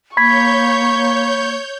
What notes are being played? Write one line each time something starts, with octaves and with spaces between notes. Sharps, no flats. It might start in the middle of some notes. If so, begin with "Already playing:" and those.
A#3 C#5 B5 C#6 G6 G#6 B6